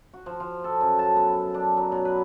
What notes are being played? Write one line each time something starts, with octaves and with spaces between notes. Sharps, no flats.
F#4
F3
F3
A4
F#2
A5
B3
D4
F#3
B2
B4